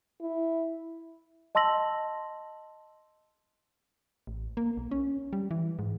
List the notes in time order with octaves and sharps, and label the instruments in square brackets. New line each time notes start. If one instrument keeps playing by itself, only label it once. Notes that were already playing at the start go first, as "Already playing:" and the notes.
[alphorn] E4
[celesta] D#5 A5 C6 E6 A#6 F#7
[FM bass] A1
A#3
B1
C#4
G3
E3
G#2